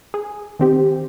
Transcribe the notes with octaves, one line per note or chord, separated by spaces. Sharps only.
G#4
D#3 C4 G4